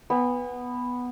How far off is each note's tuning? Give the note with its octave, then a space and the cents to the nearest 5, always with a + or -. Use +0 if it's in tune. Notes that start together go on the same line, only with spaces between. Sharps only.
B3 +0 G#5 -40